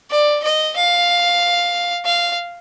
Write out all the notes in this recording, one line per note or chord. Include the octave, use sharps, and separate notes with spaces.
D5
D#5
F5
F5